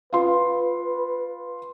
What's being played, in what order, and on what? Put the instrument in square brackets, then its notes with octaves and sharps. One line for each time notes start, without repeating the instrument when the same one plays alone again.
[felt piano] F4 C6 [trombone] B4